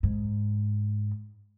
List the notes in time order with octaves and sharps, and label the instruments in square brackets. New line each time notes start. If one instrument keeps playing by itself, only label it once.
[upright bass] G#2